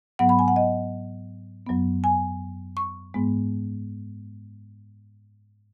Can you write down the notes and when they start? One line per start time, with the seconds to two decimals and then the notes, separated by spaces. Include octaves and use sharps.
0.19 G#2 F#3 B3 F#5
0.29 B5
0.39 G#5
0.48 F#5
0.56 D#5
1.67 F#2 F#3 B3
2.04 G#5
2.77 C#6
3.14 G#2 G#3 B3